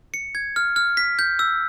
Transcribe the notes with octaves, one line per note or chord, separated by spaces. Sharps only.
C#7
G#6
F6
F6
B6
G6
E6